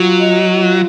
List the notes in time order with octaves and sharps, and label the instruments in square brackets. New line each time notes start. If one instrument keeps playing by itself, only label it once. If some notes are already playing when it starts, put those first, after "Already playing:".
Already playing: [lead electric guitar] F#3 [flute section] F4
[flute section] D#5
F4